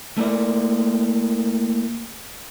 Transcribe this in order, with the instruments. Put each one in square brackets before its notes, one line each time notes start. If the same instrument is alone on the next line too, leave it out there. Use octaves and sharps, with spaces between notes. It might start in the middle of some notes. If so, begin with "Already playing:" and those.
[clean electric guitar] A3 A#3 E4 D5